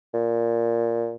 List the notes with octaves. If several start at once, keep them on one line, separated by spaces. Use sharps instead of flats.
A#2